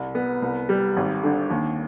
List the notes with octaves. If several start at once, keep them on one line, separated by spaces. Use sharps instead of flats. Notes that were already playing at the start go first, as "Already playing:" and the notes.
Already playing: C2
B3
C2
G3
G#1
D3
D#2